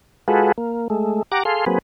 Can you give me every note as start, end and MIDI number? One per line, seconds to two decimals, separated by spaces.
0.28 0.52 56
0.28 0.52 65
0.28 0.52 66
0.28 0.52 68
0.28 0.52 69
0.28 0.52 71
0.58 0.88 58
0.90 1.23 56
0.90 1.23 57
1.32 1.43 67
1.32 1.43 78
1.32 1.43 82
1.32 1.43 86
1.45 1.65 68
1.45 1.65 69
1.45 1.65 77
1.45 1.65 84
1.66 1.78 54
1.66 1.78 58
1.66 1.78 60
1.66 1.78 68
1.66 1.78 71